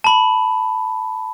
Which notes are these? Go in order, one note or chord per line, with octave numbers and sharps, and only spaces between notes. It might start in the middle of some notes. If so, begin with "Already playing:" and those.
A5 B5